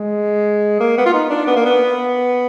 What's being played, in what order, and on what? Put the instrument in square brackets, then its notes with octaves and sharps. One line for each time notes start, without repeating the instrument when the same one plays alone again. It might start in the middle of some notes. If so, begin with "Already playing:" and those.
Already playing: [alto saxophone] G#3
A#3
B3
F4
D#4
D4
B3
A#3
B3